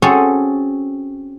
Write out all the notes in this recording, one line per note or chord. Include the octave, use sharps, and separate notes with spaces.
C4 C#4 F#4 G#4 A4 C#5